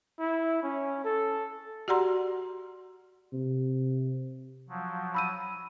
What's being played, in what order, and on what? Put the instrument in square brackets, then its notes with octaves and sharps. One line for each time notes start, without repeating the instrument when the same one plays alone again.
[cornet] E4
C#4
A4
[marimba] F#4 G4 D5 F#5 A#5 C6
[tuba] C3
[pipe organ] F3 F#3
[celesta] B5 E6 D#7